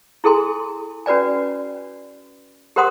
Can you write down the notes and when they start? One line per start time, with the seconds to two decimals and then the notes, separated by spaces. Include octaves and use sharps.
0.24 E4 G#4 A4 G#5 C6
1.06 C#4 F#4 B4 D5 G#5
2.76 G4 A#4 C5 F#5 C6 D#6